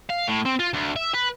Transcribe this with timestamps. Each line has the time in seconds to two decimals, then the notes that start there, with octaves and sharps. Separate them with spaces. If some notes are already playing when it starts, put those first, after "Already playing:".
0.09 F5
0.28 A2
0.45 C4
0.59 F4
0.73 D2
0.96 E5
1.14 B4